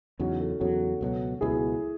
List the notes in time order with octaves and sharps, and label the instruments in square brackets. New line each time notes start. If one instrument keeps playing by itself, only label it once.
[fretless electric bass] E2 C#3 F#3 [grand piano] D#4 F#4
[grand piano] F#4 A4
[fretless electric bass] E2 C#3 F#3 [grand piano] F#4 A4
[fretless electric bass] C#2 B2 F#3
[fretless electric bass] C#2 B2 F#3 [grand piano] E4 G#4